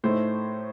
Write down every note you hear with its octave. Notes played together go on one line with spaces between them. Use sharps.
A2 A3 D#4 C5